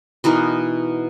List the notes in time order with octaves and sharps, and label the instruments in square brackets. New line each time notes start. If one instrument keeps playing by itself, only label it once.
[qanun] B2 E3 D#4 A#4